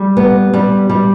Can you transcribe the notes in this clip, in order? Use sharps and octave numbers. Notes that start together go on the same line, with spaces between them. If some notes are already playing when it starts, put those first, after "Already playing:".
Already playing: G3
B3
G3
G3